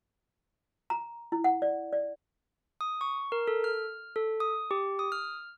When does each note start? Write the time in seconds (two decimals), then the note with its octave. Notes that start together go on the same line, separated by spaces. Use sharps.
0.90 A#5
1.32 E4
1.44 F#5
1.62 D5
1.93 D5
2.81 D#6
3.01 C#6
3.32 A#4
3.48 A4
3.64 F6
4.16 A4
4.40 D#6
4.71 G4
4.99 D#6
5.12 F6